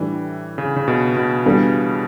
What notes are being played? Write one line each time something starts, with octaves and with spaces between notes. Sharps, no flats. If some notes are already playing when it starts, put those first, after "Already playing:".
Already playing: A2 E3 G3 D4
C#3
C#3
B2
B2
E3 G3 B3 D4 A4